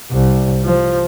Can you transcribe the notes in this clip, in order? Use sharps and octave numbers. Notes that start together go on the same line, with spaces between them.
C2
F3